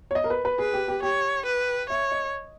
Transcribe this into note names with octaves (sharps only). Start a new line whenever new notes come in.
C#5
D#5
A#4
B4
B4
G#4 B4
G4
G4
G4 C#5
B4
C#5 E5
D#5